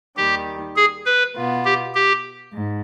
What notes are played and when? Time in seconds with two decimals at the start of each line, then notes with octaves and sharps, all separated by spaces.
0.16 D#2 D#3 G3 G4
0.76 G#4
1.06 B4
1.35 B2 B3 F4
1.65 G4
1.95 G4
2.53 G#2